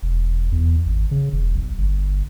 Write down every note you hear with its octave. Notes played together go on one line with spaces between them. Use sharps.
E1
E2
G#1
C#3
E1
B1
G1